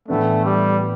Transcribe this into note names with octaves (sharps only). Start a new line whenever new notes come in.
A2 E3 A3 B3 D4
G3